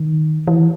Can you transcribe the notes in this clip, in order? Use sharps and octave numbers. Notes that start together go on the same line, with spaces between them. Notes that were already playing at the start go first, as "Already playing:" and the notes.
Already playing: D#3
E3